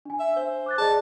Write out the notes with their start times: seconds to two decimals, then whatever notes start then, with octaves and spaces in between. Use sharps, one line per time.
0.05 D4 G#5
0.20 E5
0.36 C5
0.66 D6 F#6 A6
0.78 G#4 D5 D#5 A5